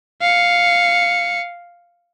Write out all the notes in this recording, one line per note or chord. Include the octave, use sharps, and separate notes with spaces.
F5 C#7